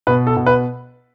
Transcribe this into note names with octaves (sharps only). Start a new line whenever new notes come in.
B2 B4
A4
B2
B4